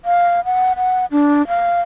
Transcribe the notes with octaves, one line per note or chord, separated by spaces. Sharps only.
F5
F#5
F#5
D4
F5